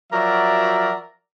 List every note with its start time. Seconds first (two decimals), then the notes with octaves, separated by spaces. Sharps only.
0.13 F3 F#3 F#4 A#4 D5 E5